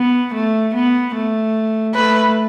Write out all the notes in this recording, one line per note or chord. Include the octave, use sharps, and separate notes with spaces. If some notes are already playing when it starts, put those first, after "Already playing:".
Already playing: B3
A3
B3
A3
A3 B4